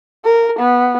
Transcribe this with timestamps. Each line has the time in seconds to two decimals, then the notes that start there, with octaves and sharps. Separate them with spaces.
0.25 A#4
0.58 B3